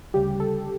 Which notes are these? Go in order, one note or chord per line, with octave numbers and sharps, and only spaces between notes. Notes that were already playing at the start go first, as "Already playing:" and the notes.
D2 C#3 G3 G4
A4